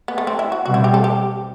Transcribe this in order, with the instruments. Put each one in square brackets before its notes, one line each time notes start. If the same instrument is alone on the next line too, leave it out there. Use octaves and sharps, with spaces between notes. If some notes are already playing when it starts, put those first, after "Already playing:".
[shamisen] B3
A3
C4
E4
F#4
[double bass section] B2 G3 C4 [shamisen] F#4
[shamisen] E4
G4
A4
G4